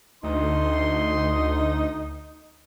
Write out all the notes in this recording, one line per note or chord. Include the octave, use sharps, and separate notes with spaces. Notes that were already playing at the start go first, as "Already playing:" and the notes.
D2 D#4 C6